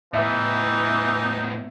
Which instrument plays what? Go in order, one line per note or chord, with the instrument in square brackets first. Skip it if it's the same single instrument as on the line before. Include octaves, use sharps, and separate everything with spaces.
[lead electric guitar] A2 B3 [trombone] E3 [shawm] D#4 [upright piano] E5